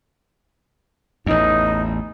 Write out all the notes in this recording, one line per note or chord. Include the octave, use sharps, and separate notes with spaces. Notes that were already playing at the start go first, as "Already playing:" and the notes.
A1 E2 D#4